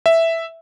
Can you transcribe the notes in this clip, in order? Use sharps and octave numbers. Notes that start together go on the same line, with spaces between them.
E5